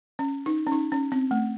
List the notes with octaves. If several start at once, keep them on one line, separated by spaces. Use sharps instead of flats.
C#4
D#4
C#4
D#4
C#4
C4
A3